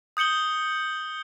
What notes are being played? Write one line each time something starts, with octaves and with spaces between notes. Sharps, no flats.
D#6 G6 C#7 F#7 G7